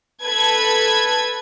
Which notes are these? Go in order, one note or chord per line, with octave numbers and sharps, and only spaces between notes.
A4 B4 G#6